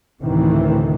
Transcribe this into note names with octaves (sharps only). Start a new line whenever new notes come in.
D2 A2 C3 D#3 E3